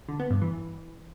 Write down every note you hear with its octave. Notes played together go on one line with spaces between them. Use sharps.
D3
B3
G2
E3